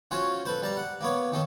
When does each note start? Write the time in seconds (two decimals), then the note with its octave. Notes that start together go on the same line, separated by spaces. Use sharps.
0.11 C#4 F4 F#4 C5 C#5
0.45 A4 B4 C5
0.62 G3 A5 A#5
0.77 F#5
1.01 A#3 B3 C#5
1.32 D#3 C#4 A4